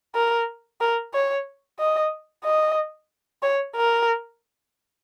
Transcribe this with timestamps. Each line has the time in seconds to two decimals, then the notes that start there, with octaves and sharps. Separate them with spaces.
0.15 A#4
0.81 A#4
1.13 C#5
1.80 D#5
2.44 D#5
3.43 C#5
3.76 A#4